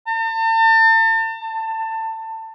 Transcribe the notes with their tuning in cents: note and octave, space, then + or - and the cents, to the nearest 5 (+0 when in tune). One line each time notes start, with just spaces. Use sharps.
A5 +40
A5 +20